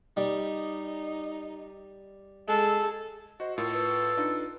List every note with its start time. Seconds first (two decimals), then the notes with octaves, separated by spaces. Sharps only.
0.17 G3 D#4
2.49 G#3 G#4 A4
3.40 F#4 C5 D#5
3.58 A2 F4 A4 A#4
3.73 B4
4.17 D4 D#4 F4